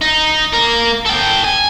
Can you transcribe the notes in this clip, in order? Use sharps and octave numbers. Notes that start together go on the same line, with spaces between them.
D#4
A#3 A#4
A4 G5
G#5